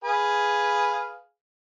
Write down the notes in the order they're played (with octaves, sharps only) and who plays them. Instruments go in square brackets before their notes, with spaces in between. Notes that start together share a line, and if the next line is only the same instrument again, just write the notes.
[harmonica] G#4 B4 F5